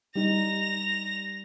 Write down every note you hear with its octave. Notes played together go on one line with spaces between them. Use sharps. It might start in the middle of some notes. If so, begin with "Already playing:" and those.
G3 D#4 A#6 F7